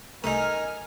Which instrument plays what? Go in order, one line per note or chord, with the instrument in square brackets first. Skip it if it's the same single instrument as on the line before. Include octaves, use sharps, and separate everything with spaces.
[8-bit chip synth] C2 A3 [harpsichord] D#4 D#6 [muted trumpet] A#4 [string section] G#5 F6